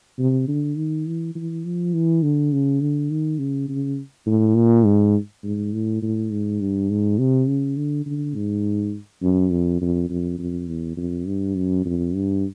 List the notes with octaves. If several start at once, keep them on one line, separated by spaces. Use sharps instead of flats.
C3
D3
D#3
E3
E3
F3
E3
D3
C#3
D3
D#3
C#3
C#3
A2
A#2
G#2
G#2
A2
A2
G#2
G2
G#2
C3
C#3
D3
D3
G#2
F#2
F2
F2
F2
F2
E2
F2
G2
F#2
F2
G2